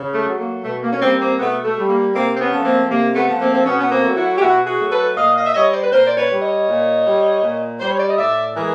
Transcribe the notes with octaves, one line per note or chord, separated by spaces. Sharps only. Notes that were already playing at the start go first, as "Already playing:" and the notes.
Already playing: C#3
A3
F#3 A3
A#3
B2 A3
A#3
C#4
G3 A#3 C4
A#3 C4
B2 A3 B3
A3
G3
A#3
C3 A#3 C4
C4
B3 C#4
F3 A3
A#3 C4
C3 A#3
A3 B3
F3 A3
A#3 C4
C4
B2 B3 C#4
B3
A#3 C4
F#3 A3
E4 F#4
G4
B2 E4 F#4
F#4 G#4
F#3 A3
A4 B4
A#2 D#5 F5
D#5 F5
E5
G3 C#5 D#5
C5 D5
B4
A#2 A#4 C5
D5
B4 C#5
G3
C#5 D#5
A#2
G3
A#2
G3 C5
C#5
D5
D#5
A2 D5 E5
E3 G#3 G#4 A#4